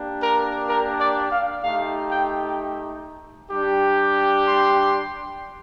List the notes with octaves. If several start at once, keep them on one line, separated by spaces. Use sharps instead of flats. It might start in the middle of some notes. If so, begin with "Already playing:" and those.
Already playing: A#3 D4 G4
A#4
A#4
D5
F5
A3 D#4 G4 F5
G5
G3 D4 G4
C6